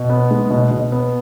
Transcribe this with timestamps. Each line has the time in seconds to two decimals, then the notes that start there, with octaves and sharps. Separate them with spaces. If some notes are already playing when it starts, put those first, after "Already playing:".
Already playing: B2
0.10 B3
0.31 G#3
0.50 B2
0.71 B2
0.92 B3